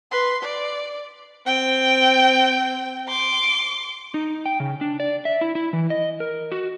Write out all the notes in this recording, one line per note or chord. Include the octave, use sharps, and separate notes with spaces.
B4 C6
D5
C4 G5
C6 D6
D#4
G5
C#3
D4
D5
E5
E4
E4
E3
D#5
A#4
F#4